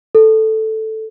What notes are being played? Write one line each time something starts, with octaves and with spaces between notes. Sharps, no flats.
A4